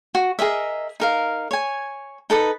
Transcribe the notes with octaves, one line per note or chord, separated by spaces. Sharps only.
F#4
G#4 A#4 D#5 E5
D#4 A#4 F5
C#5 G#5
D#4 A4 B4 D#6